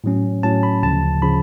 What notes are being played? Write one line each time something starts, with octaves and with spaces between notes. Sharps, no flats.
A2 F#3 C#4
A2 F#3 C#4 A5
B5
D2 C#3 F3 A5
C#3 F3 B5